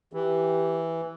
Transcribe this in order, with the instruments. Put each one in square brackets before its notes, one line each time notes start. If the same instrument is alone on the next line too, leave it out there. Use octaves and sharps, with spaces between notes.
[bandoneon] E3 [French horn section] G4